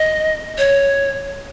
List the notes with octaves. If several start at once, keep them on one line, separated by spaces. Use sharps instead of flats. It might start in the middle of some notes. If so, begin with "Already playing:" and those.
Already playing: D#5
C#5